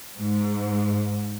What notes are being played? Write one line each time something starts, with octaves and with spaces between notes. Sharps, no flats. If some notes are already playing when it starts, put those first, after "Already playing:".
G#2